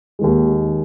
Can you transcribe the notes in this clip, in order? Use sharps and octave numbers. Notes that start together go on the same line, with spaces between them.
D#2 D#3 G#3